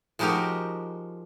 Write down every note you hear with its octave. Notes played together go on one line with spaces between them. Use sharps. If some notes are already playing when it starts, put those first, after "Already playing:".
F3 G#3 D#4 F#4 G4 A#4